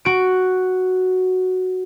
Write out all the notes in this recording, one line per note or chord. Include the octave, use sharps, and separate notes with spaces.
F#4 D7